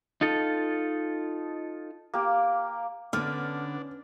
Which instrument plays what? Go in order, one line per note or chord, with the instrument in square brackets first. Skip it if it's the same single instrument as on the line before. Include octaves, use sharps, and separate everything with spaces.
[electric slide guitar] D#4 F4 A4
[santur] A#3 G4
[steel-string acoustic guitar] D3 B3 [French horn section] C#4 B4 [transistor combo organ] D4 [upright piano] F6